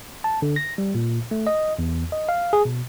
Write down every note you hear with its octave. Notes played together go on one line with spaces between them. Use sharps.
A5
D3
A#6
G3
A#2
A3
D#5
E2
D#5
F5
G#4
B2